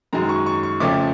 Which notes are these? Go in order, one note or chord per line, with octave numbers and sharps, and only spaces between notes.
F#2 D#3 G#3 A#5
C#6
C#6
C#6
F2 C#3 F3 A3 D6